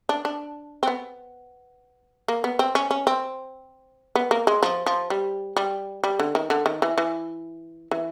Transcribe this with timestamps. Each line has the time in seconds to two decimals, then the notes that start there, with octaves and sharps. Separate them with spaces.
0.09 D4
0.25 D4
0.83 C4
0.87 B3
2.28 A#3
2.44 B3
2.59 C4
2.75 C#4
2.91 C#4
3.07 C4
4.15 B3
4.31 A#3
4.47 G#3
4.63 F3
4.86 F3
5.10 G3
5.57 G3
6.04 G3
6.19 D3
6.35 D#3
6.50 D3
6.66 D#3
6.82 E3
6.98 E3
7.91 E3